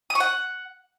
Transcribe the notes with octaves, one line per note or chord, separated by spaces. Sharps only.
D#6
C#6
F#5